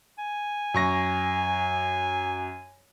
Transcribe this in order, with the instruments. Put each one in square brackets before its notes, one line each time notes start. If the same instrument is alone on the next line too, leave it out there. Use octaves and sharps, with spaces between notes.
[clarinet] G#5
[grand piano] F#2 C#6 A#6